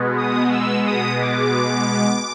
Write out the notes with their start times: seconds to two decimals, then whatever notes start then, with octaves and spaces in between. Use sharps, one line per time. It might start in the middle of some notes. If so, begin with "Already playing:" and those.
Already playing: B2 G#3 B3
0.17 D#6
0.51 E6
0.87 D#6
1.21 D6